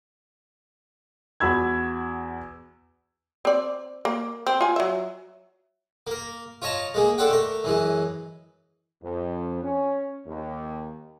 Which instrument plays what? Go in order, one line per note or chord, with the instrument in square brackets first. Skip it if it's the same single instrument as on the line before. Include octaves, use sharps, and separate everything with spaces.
[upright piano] E2 F#4 B5 E6 G#6
[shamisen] C4 D5
A#3
C4
F4 G#5
F#3 E5
[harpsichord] A#3 A#4
F4 C#5 D#5 A5 A#5
G#3 A#3 G#4
D4 A4 C5 D5 F#5 G5
A3 A#4
F#2 E3 G#3
[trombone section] F2
C#4
D#2